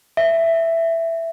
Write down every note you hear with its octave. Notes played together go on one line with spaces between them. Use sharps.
E5